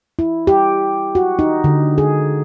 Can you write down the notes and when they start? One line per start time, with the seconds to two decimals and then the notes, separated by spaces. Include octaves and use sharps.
0.19 E4
0.47 G4
1.15 F#4
1.39 D#4
1.64 D3
1.98 G#4